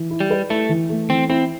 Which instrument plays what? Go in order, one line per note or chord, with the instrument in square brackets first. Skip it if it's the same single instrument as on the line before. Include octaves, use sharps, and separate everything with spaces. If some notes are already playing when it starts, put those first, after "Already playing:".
Already playing: [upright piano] E3
E4
[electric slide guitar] G3
[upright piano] B4
[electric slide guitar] A3 [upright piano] E4
[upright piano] E3
A3
[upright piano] E3 [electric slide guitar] C4
[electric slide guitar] C4 [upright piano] E4